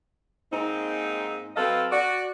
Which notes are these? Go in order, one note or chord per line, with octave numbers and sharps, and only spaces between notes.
G#2 A#3 C4 D#4
F#3 C4 A4 B4 D#5 F5
F#4 D5